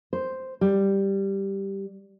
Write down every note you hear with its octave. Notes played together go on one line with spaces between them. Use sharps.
C5
G3